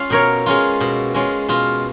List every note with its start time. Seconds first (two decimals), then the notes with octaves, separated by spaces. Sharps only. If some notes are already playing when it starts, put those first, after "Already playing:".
Already playing: C#4 F4 F5
0.10 B2 A#4 C#5
0.46 G#3 C#4 F4
0.81 B2
1.14 G#3 C#4 F4
1.49 B2 F4